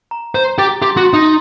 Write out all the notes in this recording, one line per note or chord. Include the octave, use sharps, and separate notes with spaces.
A#5
C5 A#5
G4 A6
G4 C6
F#4
C6
D#4